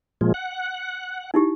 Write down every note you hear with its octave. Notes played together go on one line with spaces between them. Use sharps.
A#2 F3 G#3
F#5
D#4 E4 G4